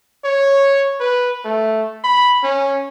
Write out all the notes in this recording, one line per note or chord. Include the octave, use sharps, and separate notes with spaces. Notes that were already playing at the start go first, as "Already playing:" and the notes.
C#5
B4
A3
B5
C#4